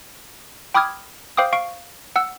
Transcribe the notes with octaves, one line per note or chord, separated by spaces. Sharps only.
G5 B5 D6 D#6 F6 G#6
C5 F5 G5 D6 D#6
F5 C#6 D7
F#5 E6